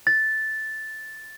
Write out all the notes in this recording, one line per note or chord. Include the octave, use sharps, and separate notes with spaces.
A6